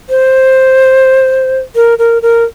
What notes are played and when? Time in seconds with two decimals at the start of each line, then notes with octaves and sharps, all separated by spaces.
0.10 C5
1.76 A#4
1.99 A#4
2.22 A#4